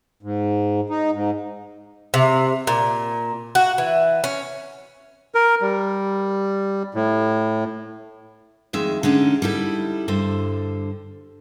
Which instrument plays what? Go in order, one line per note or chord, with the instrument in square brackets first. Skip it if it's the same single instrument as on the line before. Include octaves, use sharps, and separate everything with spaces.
[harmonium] G#2
D#4
G#2
[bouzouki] C3
A#2
F#4
E3
C#4
[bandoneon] A#4
G3
A2
[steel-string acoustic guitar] F2 D#3 G#3 E5
D3 G#3 C#4 D#4
G3 D#4 E4 A4
G2 D3 A4 C5